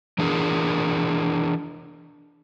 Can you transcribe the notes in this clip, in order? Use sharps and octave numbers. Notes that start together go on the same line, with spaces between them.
E3 D4 G#4 A#4